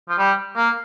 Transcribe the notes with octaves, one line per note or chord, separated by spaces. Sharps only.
F3
G3
A#3